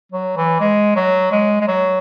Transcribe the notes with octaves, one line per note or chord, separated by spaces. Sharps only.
F#3
E3
G#3
F#3
G#3
G#3
F#3